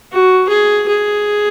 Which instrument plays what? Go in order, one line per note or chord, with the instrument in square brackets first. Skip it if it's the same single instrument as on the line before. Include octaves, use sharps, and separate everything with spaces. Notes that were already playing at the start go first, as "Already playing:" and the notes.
[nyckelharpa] F#4
G#4
G#4